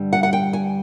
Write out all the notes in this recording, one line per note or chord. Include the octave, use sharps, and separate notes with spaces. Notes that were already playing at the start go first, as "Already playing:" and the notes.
Already playing: G2 D3 G3
F#5
F#5
G5
G#5